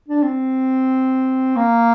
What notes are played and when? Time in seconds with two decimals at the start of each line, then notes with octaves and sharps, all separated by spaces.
0.08 D4
0.23 C4
1.56 A#3